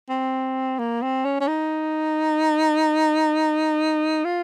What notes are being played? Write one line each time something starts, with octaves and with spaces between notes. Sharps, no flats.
C4
A#3
C4
C#4
C#4
D#4
F4